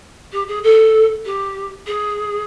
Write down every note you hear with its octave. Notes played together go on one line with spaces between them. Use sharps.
G4
G#4
A4
G4
G#4